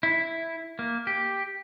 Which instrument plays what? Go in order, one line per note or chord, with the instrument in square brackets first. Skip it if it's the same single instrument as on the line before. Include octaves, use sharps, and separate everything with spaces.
[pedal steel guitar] E4
A#3
G4